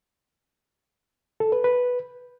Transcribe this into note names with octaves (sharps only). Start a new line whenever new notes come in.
A4
B4
B4